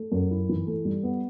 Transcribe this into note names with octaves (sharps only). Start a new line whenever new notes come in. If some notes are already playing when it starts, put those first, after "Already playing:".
Already playing: A3
F#2
E4
E3
A3
G3
B3